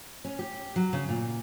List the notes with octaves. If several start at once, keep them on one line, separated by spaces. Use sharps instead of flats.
C#4
G4
F#3
C#3
A#2